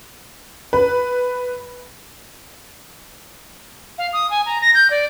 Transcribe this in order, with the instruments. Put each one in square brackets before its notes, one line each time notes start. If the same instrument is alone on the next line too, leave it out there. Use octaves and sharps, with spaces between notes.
[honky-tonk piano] B4
[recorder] F5
D#6
G#5
A#5
A#6
G6
D5